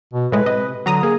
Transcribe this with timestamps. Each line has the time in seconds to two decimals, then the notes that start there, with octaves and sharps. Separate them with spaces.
0.13 B2
0.32 A2 G#3 B4
0.46 C3 D#5
0.86 D3 F#3 A#5 D#6
1.03 A#3 G#4